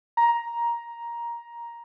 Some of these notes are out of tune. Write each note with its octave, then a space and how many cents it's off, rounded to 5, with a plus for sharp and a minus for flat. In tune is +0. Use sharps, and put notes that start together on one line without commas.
A#5 +10